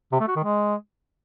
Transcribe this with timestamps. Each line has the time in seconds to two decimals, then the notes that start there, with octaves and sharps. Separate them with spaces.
0.12 C3
0.20 A3
0.28 F#4
0.36 D#3
0.44 G#3